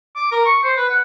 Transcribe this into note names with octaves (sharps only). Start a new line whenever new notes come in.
D6
A#4
C#6
C5
B4
F#5